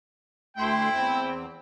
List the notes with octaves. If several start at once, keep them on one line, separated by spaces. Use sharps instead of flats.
D2 A3 E4 G5 C6
E2 C4